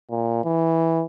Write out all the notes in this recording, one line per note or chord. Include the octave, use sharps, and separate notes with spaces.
A#2
E3